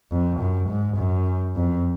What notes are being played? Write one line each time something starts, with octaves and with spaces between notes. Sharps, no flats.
F2
F#2
G#2
F#2
F2